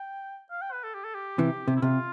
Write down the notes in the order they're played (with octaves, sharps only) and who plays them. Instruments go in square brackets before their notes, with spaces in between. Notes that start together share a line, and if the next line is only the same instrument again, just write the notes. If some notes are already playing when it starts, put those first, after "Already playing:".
Already playing: [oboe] G5
F5
G5
B4
A4
G4
A4
G4
[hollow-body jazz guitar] C3 E3
C3
[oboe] E4
[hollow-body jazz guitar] C3 [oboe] F4